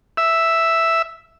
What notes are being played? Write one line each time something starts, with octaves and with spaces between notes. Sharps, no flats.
E5